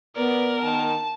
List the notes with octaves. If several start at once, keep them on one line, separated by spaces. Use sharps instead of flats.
B3 A#4 B4 D5
D#3 A5